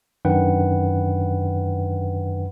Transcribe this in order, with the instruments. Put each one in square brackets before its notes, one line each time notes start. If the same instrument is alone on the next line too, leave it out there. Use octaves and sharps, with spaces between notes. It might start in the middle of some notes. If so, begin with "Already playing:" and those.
[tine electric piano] F#2 D#3 D4 B4 F#5 G5